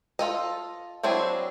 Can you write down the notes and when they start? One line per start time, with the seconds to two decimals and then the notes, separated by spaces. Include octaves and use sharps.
0.19 F4 A4 D#5
1.03 F#3 C4 D4 E4 G#4